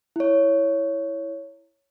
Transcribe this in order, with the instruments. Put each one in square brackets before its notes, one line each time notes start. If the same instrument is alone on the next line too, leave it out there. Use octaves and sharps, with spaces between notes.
[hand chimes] E4 C#5